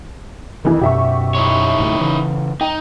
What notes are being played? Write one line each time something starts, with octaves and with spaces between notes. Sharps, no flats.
F2 D#3 E3
F#2 B2 G4 E5 C#6
D#4 E4 C#5
E1 D2 A2
C#3 E3
D#4 G5